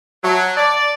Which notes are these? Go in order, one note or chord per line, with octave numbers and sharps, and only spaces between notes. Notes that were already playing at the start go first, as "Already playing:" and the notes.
F#3 E5 A5
D5 A5 D6